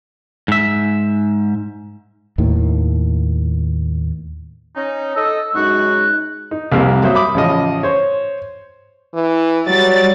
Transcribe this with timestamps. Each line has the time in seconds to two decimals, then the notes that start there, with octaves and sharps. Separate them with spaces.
0.48 G#2 E5
2.38 D#2 A2 D#3
4.76 C#4 D#4
5.16 A4 D#5 E6
5.55 F#2 G#3 D#4 F#4 C#6 F#6
6.51 D#4
6.72 C2 F2 G3 A#3 C4 A#4
7.02 F#3 A#3 C5 E5 D#6
7.14 E5 B5 D6 D#6
7.34 A1 C#3 F3 D#5
7.83 C5 C#5
9.14 E3
9.67 F#3 G3 D5 A6